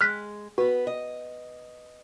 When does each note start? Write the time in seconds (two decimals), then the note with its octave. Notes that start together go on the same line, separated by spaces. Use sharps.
0.01 G#3 F6 F#6 B6
0.58 B3 F#4 B4
0.87 D#5